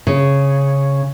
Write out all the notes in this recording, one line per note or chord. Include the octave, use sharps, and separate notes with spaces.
C#3